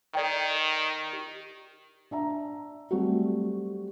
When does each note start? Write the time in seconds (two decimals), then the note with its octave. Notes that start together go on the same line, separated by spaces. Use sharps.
0.15 D#3 A4 D5 G5
1.13 G4
2.11 D4 E5 A#5
2.91 F#3 G3 A3 C4 F#4 G4